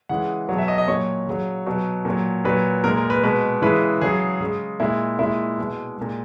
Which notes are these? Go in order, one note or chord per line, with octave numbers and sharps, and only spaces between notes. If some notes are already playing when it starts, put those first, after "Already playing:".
C#3 E3 G#3 F#5
B2 F#3 F#5
E5
D#5
D#5
A#2 F#3 C#5
C#3 F#3
B2 F#3
A#2 F#3
A#2 F#3 B4
A#2 G#3 A#4
A#4
B4
B2 G#3 B4
C#3 E3 G#3 B4
C#3 F#3 G#4
C#3 G#3
A#2 G#3 E4
A#2 G#3 E4
B2 G#3
A#2 G#3